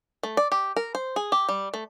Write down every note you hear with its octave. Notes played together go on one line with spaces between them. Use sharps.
A3
D5
G4
A#4
C5
G#4
G4
G3
A3